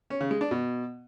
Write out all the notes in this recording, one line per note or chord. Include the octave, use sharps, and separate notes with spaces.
C#4
C#3
G#3
D4
B2